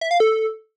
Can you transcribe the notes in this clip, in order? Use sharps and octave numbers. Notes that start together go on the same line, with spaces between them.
E5
F5
A4